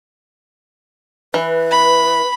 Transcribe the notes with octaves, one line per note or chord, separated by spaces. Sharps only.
E3 B4
B5